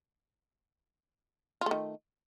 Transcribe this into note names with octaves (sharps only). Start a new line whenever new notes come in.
D#3 A3 F4